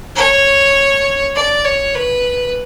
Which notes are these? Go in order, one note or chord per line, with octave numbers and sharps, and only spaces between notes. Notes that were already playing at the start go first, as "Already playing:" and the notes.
C#5
D5
C#5
B4